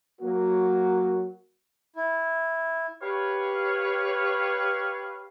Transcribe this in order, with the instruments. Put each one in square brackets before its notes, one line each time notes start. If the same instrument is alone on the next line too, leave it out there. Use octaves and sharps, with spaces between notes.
[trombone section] F#3 A#3 F#4 A#4
[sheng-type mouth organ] E4
[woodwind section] G4 B4 C#5 F5